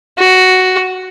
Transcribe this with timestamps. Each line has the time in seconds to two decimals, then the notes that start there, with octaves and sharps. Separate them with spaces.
0.18 F#4